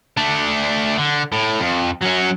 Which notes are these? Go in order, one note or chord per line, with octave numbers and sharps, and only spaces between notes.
A3 D4
D3
A2
F2
F#3 C#4